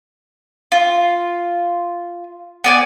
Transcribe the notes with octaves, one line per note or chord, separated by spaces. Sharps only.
F4
B3 D5 G#5